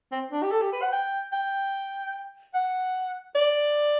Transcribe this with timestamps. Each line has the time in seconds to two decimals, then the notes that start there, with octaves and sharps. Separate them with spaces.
0.12 C4
0.32 D4
0.42 G4
0.51 A4
0.62 G4
0.72 B4
0.82 F#5
0.92 G5
1.32 G5
2.54 F#5
3.35 D5